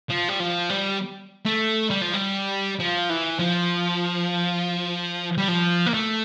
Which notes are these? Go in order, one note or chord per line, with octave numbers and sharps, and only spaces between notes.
F3
G3
F3
G3
A3
G3
F3
G3
F3
E3
F3
G3
F3
A#3
A3